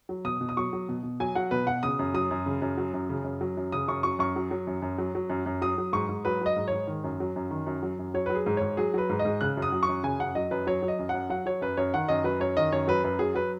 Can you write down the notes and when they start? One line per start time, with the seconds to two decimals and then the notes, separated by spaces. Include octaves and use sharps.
0.09 F#3
0.25 B2 D#6
0.41 B2
0.49 D#6
0.57 F#3 C#6
0.73 F#3
0.89 B2
1.03 B2
1.20 F#3 G#5
1.35 F#3 F#5
1.51 B2 B4
1.67 B2 F#5
1.83 C#3 D#6
1.99 F#2
2.14 F#3 D#6
2.31 F#2
2.46 C#3
2.62 F#2
2.78 F#3
2.94 F#2
3.09 C#3
3.24 F#2
3.41 F#3
3.57 F#2
3.72 C#3 D#6
3.88 F#2 C#6
4.03 F#3 C#6
4.19 F#2 C#6
4.36 F#3
4.51 F#3
4.67 F#2
4.82 F#2
4.98 F#3
5.15 F#3
5.30 F#2
5.46 F#2
5.62 F#3 D#6
5.78 F#3
5.93 G#2 C#6
6.09 G#2
6.25 F#3 B4
6.41 F#3 D#5
6.56 G#2
6.68 G#2 C#5
6.87 D#3
7.04 F#2
7.20 F#3
7.36 F#2
7.51 D#3
7.67 F#2
7.83 F#3
7.99 F#2
8.14 F#3 C#5
8.26 F#3 B4
8.35 G#4
8.46 G#2
8.57 G#2 C#5
8.77 F#3 G#4
8.94 F#3 B4
9.09 G#2
9.19 D#5
9.25 G#2
9.41 C#3 F#6
9.57 F#2
9.62 D#6
9.72 F#3
9.83 C#6
9.89 F#2
10.03 C#3 G#5
10.19 F#2 F#5
10.35 F#3 D#5
10.51 F#2 B4
10.67 F#3 C#5
10.82 F#3
10.88 D#5
10.99 F#2
11.09 F#2 F#5
11.30 F#3 F#5
11.46 F#3 C#5
11.61 F#2 B4
11.77 F#2 C#5
11.94 D#3 F#5
12.08 F#2 D#5
12.24 F#3 B4
12.40 F#2 C#5
12.57 D#3 D#5
12.72 F#2 C#5
12.88 F#3 B4
13.04 F#2 B4
13.19 F#3 G#4
13.35 F#3 B4